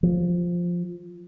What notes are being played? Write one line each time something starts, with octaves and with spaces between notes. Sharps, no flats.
F3